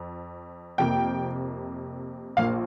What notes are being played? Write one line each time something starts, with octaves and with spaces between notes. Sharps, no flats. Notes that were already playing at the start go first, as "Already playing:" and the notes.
Already playing: F2
F2 C3 A#3 G5
A#1 A#2 A#3 F5